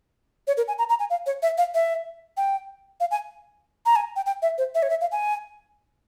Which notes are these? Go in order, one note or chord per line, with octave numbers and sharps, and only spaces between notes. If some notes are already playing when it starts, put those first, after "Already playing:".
C#5
A#4
G#5
A#5
A#5
G#5
F5
C#5
E5
F5
E5
G5
F5
G#5
A#5
G#5
G5
G5
E5
C5
E5
C#5
E5
F5
G#5